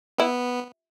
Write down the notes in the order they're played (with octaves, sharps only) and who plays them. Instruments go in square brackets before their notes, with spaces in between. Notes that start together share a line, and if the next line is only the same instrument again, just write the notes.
[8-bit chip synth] B3 [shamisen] E4